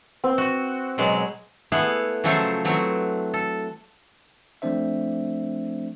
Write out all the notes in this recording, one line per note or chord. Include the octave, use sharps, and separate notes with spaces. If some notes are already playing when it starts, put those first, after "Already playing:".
C4
F#4
B2 F#3 G#3
A3 B3 E4 G#4 F5 F#5
C#3 F3 F#3 A3 A4 C5
E3 F#3 A3 C4
A4
F3 A3 C4 D4 C5 E5